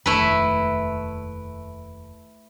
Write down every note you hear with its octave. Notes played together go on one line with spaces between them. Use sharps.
F1 D#2 A3 E4 B4